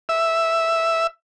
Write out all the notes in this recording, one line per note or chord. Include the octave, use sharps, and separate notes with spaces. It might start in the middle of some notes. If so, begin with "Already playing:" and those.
E5